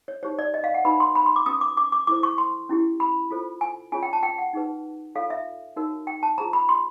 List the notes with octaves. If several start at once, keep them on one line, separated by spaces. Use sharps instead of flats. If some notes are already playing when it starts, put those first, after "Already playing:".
C#5
D#4 G4 C5 C#5
D5
D#5
F5
F#5
D#4 F#4 B4 B5
C6
B5
C6
D6
C#4 F#4 B4 D#6
D6
D6
D6
E4 A4 C5 D6
C#6
C6
C#4 E4 G4
B5
F4 A4 C5
G#5
C#4 F4 G#4 C#5 G#5
G5
A5
G5
F#5
D#4 G#4 B4
F4 A4 C#5 F5
E5
D#4 F#4 A#4 C#5
G5
A5
F4 G#4 C5 A#5
B5
C6